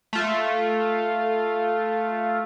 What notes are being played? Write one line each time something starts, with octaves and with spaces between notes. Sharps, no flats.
A3 F4